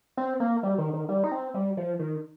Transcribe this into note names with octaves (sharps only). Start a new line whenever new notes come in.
C4
A#3
G3
D#3
D#3
G3
D#4
C4
G3
F3
D#3